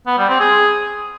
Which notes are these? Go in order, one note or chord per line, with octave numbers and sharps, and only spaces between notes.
B3
G3
C4
G#4